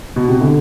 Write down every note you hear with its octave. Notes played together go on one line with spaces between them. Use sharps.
B2
C3
D3